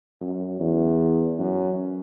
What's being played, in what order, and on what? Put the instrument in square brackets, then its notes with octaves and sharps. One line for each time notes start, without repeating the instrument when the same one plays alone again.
[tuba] F#2
E2
F#2